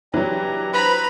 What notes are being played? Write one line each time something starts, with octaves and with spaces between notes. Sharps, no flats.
E3 F#3 D4 G4 A#5
B4 C5 A#5 B5